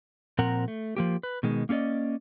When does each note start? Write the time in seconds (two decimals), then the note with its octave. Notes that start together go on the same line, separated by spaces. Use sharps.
0.39 A#2 F3 C4 A#4 F#5 A#5
0.68 A3
0.97 F3 A#3 G4
1.23 B4
1.43 B2 D#3 G#3
1.69 A#3 C#4 G#4 D5 D#5